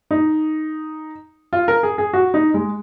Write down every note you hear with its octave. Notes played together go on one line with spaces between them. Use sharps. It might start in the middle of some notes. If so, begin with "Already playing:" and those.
D#4
F4
A#4
G#4
G#4
F#4
D#4
G#3